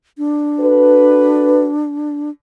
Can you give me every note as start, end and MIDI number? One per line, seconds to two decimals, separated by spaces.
0.18 2.30 62
0.60 1.70 66
0.60 1.70 69
0.60 1.70 71